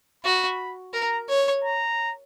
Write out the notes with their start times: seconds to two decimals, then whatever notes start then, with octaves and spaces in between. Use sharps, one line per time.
0.25 F#4 B5
0.94 A#4 A#5
1.29 C#5
1.64 A#5